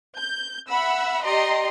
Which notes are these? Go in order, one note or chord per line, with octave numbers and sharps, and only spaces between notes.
G6
E5 F#5 B5 E6
G4 D5 D#5 A#5 C6